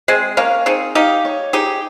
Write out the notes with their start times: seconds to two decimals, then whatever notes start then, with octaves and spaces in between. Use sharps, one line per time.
0.08 G#3 C4 G#4
0.37 A#3 C#4 F5
0.66 C4 D#4 G#4
0.95 D#4 G4 F5
1.25 C#5
1.53 D#4 G4 G#4